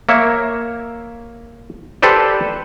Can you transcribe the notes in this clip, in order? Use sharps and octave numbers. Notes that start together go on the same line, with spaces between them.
A#3 C#5 E5
G4 A4 B4 C5 D5